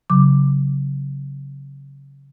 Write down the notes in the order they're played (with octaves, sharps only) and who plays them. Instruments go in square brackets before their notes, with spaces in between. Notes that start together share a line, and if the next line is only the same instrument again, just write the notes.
[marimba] C#3 F#3 D6